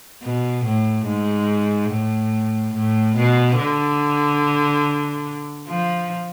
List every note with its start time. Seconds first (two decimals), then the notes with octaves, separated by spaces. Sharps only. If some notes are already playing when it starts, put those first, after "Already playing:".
0.23 B2
0.65 A2
1.07 G#2
1.91 A2
2.74 A2
3.16 B2
3.58 D3
5.68 F3